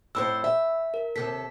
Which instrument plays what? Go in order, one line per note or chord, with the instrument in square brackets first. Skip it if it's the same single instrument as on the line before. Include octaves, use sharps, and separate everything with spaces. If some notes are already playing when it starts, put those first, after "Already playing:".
[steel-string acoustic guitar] F2 A2 C5 [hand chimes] B5 E6
[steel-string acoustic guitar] E5
[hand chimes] A#4
[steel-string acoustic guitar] D#2 C3 A4 [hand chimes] B6